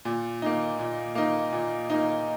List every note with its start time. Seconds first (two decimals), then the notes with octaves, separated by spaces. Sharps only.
0.05 A#2
0.42 A#3 D#4
0.79 A#2
1.15 A#3 D#4
1.53 A#2
1.90 A#3 D#4